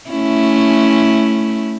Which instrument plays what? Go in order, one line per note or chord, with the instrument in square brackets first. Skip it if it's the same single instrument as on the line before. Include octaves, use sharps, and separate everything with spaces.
[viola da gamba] A3 C#4 E4